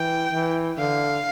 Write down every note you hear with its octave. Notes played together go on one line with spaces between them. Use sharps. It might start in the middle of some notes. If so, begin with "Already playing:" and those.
Already playing: E3 G5
E3
D3 F5